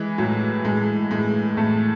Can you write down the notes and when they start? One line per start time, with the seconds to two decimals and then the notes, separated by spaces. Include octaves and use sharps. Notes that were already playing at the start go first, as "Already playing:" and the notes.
Already playing: E3 G#3
0.18 A2 F#3
0.64 A2 G#3
1.11 A2 G#3
1.57 A2 A3